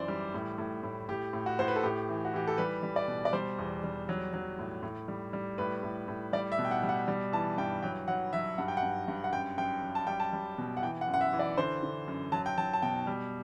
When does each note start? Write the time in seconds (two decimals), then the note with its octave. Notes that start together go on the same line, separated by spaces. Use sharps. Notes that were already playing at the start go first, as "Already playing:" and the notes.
Already playing: F#2 E3 C5 D5
0.08 G3
0.34 A2
0.58 A2
0.83 A2
1.09 A2 G4
1.33 A2
1.46 F#4
1.59 A2 C5
1.68 B4
1.76 A4
1.83 A2 G4
2.09 E3
2.25 F#4
2.34 E3 G4
2.47 A4
2.58 G3 B4
2.83 G3
2.96 D5
3.08 B2
3.25 D5
3.33 G3 C5
3.58 E2
3.84 G3
4.09 F#3
4.33 F#3
4.59 A2
4.83 A2
5.08 G3
5.33 G3
5.58 A2 B4
5.83 A2
6.08 A2
6.33 G3 D5
6.52 E5
6.59 B2
6.65 G5
6.71 F#5
6.83 G3
6.89 F#5
7.08 G3
7.32 E3 A5
7.58 G2 G5
7.83 F#3 G5
8.08 F#3 F#5
8.33 F#3 E5
8.58 G2 F#5
8.68 G5
8.77 F#5
8.83 G2
9.08 G2
9.24 F#5
9.33 F#2 G5
9.58 F#2 G5
9.82 F#2
9.95 A5
10.07 G3 G5
10.20 A5
10.33 G3
10.58 B2
10.77 F#5
10.82 E3 G5
11.01 F#5
11.08 F#2
11.14 F#5
11.21 E5
11.33 E3
11.39 D5
11.58 D3 C5
11.83 D3
12.08 F#2
12.32 F#3 A5
12.46 G5
12.58 F#3 A5
12.73 A5
12.82 B2 G5
13.07 G3